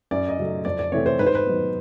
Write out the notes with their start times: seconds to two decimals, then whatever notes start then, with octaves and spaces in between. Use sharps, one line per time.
0.11 F#2 D5
0.29 D#5
0.38 C#3 F#3 A3
0.65 F2 D5
0.79 D5
0.92 C3 E3 A3 C4 C#5
1.06 C5
1.19 G#2 B4
1.27 C5
1.35 B4
1.47 D#3 F#3 B3